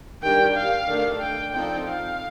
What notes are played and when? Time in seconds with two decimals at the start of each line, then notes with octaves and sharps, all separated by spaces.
0.23 D#3 G3 D4 G4 A#4 G5
0.56 F5
0.87 D#3 A3 D4 A4
1.21 G5
1.53 F3 C4 D#4 A4 D5 G5
1.87 F5